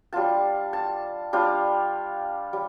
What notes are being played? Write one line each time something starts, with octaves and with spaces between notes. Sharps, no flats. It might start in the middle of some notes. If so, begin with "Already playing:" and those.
G3 D4 F4 A5
A5
G3 D4 F4
G3